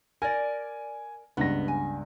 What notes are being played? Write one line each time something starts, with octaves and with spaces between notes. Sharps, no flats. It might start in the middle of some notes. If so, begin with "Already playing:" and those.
A#4 D5 G#5
C#2 G2 B3 A#6
G#5